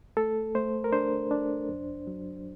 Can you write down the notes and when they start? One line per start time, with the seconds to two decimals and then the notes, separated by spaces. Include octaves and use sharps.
0.17 A3 A4
0.55 A3 C5
0.84 A#4
0.92 D4 C5
1.31 D4
1.69 F#2
2.07 F#3